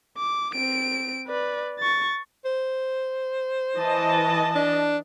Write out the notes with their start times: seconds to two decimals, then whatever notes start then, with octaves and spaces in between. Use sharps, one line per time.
0.17 D6
0.55 C4 D7
1.28 B4 D5
1.79 C#6 A6
2.45 C5
3.77 E3 D#5 A5
4.55 D4